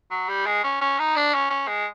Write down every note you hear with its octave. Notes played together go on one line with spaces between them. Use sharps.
F#3
G3
G#3
C#4
C#4
D#4
D4
C#4
C#4
G#3